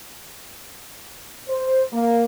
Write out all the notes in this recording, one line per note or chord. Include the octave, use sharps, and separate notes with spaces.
C5
A#3